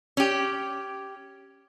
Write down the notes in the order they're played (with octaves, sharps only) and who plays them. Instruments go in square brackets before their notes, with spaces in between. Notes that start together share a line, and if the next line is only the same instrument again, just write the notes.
[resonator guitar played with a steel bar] C#4 G4